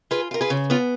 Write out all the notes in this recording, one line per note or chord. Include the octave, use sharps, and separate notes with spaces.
F4 G#4 B4
F4 A#4
G#4 B4
C#3
B3 F4